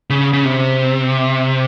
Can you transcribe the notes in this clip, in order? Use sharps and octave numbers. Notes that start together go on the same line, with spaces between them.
C#3
C#3
C3